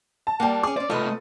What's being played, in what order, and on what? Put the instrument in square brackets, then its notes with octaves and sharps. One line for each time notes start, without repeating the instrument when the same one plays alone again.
[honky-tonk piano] A5
[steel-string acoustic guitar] G3 A#3 [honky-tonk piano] F#5 G5 A5
[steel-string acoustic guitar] C#4 G#4 [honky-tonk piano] D6
[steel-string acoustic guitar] C#4 C5 [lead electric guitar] D5
[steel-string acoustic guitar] C3 D#5 [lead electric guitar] A3 F4 [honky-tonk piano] A4 B4